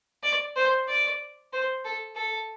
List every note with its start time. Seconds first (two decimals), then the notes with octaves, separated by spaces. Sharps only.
0.23 D5
0.56 C5
0.88 D5
1.53 C5
1.85 A4
2.16 A4